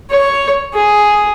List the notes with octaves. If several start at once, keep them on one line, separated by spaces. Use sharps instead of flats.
C#5
G#4